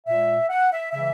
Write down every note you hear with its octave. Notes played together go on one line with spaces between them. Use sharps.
A#2 G#3 E5
F#5
E5
C#3 E3 G#3 E5